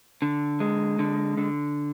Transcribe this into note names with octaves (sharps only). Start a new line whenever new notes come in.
D3
G#3
D3
D3